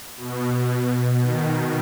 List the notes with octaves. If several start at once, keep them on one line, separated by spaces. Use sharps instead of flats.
B2
D#3